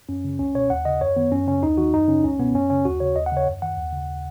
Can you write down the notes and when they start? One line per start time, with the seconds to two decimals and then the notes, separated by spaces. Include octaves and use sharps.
0.09 F#2 C#4
0.24 C#3
0.39 C#2 C#4
0.55 B2 C#5
0.70 D#2 F#5
0.85 C#3 D#5
1.01 F#2 C#5
1.16 D#3 B3
1.32 F#2 C#4
1.47 C#3 C#4
1.63 D#2 D#4
1.78 D#3 F#4
1.94 F#2 D#4
2.08 C#3 C#4
2.24 C#2 C#4
2.39 B2 B3
2.55 F#2 C#4
2.70 C#3 C#4
2.85 D#2 F#4
3.00 C#3 C#5
3.16 D#2 D#5
3.26 F#5
3.32 C#3 C#5
3.47 F#2
3.62 D#3 F#5
3.78 D#2
3.93 C#3